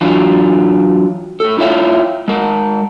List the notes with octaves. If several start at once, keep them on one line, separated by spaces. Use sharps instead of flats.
E3 F#3 D4 F4
A2 A4
E4 F4 C#5 E5 F5
G#3 A#4